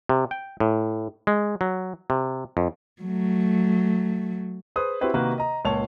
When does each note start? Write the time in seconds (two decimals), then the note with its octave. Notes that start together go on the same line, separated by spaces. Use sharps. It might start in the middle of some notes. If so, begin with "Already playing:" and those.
0.09 C3
0.31 G5
0.60 A2
1.27 G#3
1.61 F#3
2.10 C3
2.57 F2
3.02 F#3 A3
4.76 G#4 B4 C5 D#6
5.01 C4 E4 F#4 G4 B4 C5
5.14 C3 D#3 A#3 F#4 A#4 B4
5.38 D#5 A#5
5.65 C#2 A#2 C#5 A5 F7